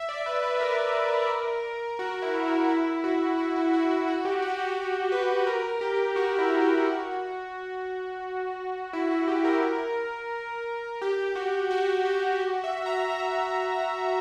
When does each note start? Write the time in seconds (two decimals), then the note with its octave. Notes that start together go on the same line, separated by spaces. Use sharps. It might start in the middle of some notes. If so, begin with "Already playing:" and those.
Already playing: E5
0.09 D5
0.26 B4
0.43 B4
0.60 A#4
1.99 F#4
2.22 E4
2.45 E4
2.69 E4
3.04 F#4
3.38 F#4
3.56 E4
3.73 F#4
3.90 F#4
4.08 F#4
4.25 G4
4.42 F#4
4.60 G4
5.12 B4
5.47 A#4
5.81 G4
6.16 F#4
6.38 E4
6.62 G4
6.85 F#4
8.93 E4
9.11 F#4
9.28 G4
9.45 A#4
11.02 G4
11.35 F#4
11.71 F#4
12.05 G4
12.40 F#4
12.64 E5
12.86 A#5
13.10 E5